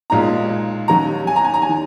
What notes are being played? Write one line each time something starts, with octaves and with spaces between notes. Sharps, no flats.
B1 A#2 G#3 D#4 A#5
D#2 D#3 F#3 C#4 A#5
G#5
A#5
G#5
A#5
G#5
D#3